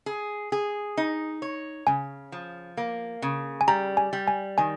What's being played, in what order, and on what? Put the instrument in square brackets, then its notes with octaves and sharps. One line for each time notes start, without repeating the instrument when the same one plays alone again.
[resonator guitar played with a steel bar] G#4
G#4
D#4
C#5
[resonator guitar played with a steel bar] C#3 [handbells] G#5
[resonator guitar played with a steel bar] F3
A#3
C#3
[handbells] G#5
[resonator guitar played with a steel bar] G3 [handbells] A#5
[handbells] G#5
[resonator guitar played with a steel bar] G3
[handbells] G#5
[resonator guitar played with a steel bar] D#3 [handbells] G#5